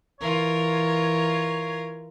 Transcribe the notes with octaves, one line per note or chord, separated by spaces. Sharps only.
E3 F4 A#4 C#5